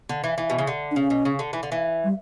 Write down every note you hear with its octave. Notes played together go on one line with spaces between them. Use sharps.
D3
E3
E3
B2
C#3
D3
D4
C#3 C#4
B2
C#3
D3
E3
D3
E3
G3